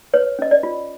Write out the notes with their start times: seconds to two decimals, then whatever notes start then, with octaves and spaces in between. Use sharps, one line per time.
0.14 B4 C#5
0.39 C#4 D#5
0.51 D5
0.63 F4